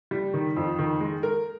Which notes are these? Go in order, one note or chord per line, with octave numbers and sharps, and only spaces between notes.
G3
D#3
F2
D#3
G#3
A#4